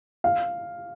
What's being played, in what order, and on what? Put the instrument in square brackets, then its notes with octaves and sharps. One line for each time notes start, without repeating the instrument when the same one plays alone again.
[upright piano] F5